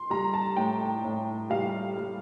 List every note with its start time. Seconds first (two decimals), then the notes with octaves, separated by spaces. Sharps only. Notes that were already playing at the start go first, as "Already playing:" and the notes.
Already playing: C6
0.10 G3 A#5
0.34 A5
0.56 A2 G5
1.04 A2
1.50 G3 F5
1.97 G3